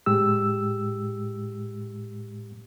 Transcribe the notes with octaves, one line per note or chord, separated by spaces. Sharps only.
A2 G#3 G4 E6